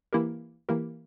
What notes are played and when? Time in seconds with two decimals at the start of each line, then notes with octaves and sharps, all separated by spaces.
0.13 E3 A#3 E4 G4 A#4
0.69 E3 A#3 E4 G4 A#4